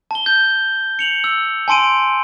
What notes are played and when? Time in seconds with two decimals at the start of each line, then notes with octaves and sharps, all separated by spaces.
0.11 A5 G7
0.26 G6
0.99 C#7 F7 F#7
1.24 E6
1.68 G#5 A5 C6 D7 D#7